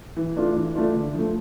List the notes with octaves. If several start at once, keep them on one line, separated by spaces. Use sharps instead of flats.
E3
A3 D4 F4
E3
A3 D4 F4
D3
F3 A3